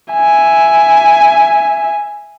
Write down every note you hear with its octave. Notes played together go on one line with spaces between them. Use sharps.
E5 G#5